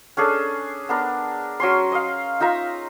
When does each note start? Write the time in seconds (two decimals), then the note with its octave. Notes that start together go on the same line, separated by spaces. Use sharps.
0.17 C#4 D4 G#4 A4
0.89 B3 D4 A#4
1.60 F#3 C#4 C6
1.92 D#5 F5
2.40 D#4 F4 E5 A#5